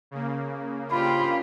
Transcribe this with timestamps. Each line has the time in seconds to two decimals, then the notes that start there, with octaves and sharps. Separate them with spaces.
0.11 C#3 A#3
0.92 D4 F4 G4 C5 B5